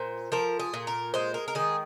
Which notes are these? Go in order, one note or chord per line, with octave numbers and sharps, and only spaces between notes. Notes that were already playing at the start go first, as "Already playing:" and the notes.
Already playing: A#2 C5
F3 A#4
G#4
A#2
A#4
G#3 C5
A#4
A#4
D#3 G#4